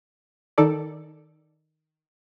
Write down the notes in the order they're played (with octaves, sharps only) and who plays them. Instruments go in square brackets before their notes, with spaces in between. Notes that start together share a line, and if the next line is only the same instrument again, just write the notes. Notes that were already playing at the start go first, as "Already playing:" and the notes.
[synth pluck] D#3 D#4 A4 D5